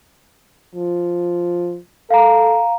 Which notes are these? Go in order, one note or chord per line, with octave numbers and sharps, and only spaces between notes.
F3
A4 F5 A#5